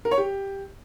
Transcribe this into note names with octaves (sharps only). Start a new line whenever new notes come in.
A#4
C#5
G4